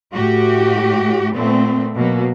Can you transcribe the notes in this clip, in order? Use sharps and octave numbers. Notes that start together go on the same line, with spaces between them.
A2 F#4 G4
A#2 A3 B3 C4
B2 F#3 A#3